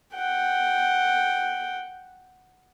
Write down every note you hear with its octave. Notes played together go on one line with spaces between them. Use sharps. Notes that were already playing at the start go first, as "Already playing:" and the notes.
F#5 G5